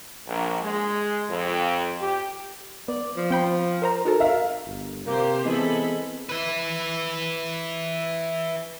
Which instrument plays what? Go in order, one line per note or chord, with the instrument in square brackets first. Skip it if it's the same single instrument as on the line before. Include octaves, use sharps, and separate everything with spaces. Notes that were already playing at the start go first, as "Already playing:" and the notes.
[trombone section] A#1
G#3
F2
G4
[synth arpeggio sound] B3 [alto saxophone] D5
[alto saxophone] F3
[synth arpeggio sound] C4 G5 B5
A#4 C5 A#5
[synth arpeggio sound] D#4 F#4 A4 [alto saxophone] A#4
[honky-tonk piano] E5 F5
[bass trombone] G1
[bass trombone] C3 [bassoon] A#3 [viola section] G4 C5
[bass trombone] E3 [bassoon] G#3 [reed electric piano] B3 C4 B4 [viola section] G#4 A4 B5
[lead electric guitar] E4 B4